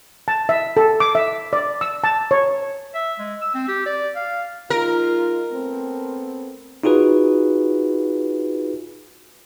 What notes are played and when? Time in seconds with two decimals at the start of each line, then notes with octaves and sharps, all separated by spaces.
0.28 A5
0.49 E5
0.77 A4
1.00 D6
1.15 E5
1.53 D5
1.81 E6
2.04 A5
2.31 C#5
2.94 E5
3.19 G#3
3.42 E6
3.54 C4
3.68 G4
3.86 D5
4.16 F5
4.70 G#3 D#4 F4 A#4
5.51 A3 B3 C4
6.83 D#4 F4 F#4 G#4 B4